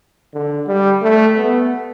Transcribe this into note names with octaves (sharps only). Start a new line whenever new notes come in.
D3
G3
A3
B3